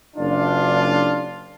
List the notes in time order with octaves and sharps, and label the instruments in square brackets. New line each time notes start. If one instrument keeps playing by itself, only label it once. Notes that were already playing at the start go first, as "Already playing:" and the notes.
[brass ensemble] F#1 D4 F4